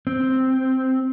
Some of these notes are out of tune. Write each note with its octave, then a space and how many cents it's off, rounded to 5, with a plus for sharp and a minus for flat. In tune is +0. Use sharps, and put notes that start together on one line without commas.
C4 +0